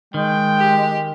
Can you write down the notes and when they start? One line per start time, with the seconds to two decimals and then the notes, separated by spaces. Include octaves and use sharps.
0.14 D#3 G#3 G5
0.58 G4